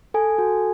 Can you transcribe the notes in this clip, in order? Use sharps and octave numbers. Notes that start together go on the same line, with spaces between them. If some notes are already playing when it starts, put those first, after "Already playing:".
A4 G#5
F#4